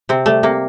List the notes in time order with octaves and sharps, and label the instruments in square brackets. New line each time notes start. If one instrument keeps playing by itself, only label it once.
[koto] C3 C4
G3 A3
C3 A#3